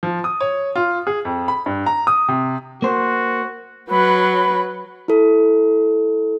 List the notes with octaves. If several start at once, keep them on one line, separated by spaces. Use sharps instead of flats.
F3
D#6
C#5
F4
G#4
F2
B5
G2
A#5
D#6
C3
A#3 F#4 C5
F#3 B4 B5
E4 A4